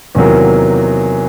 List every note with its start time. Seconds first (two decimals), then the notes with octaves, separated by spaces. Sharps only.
0.15 E2 C3 D#3 F#3 A#3